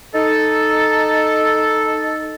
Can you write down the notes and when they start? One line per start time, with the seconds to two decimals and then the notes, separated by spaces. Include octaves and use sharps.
0.15 D#4 A4